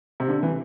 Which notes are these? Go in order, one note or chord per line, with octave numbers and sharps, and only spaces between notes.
C3
D3
E3